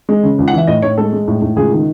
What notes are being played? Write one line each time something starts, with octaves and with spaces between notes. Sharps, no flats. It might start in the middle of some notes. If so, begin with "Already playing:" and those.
G#3
C#3
C#2
F#5
E3 E5
A2 D#5
A2 C#5
G#3 A4
G#3
A2
A2
C#2 G#4
D#3